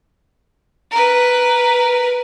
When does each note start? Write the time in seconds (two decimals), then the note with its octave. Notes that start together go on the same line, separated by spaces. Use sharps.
0.91 A#4 B4